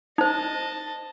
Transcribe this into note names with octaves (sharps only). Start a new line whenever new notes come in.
D#4 C5 D#5 A5